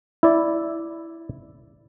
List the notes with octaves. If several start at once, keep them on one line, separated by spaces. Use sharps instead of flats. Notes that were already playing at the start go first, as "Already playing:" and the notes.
E4 D5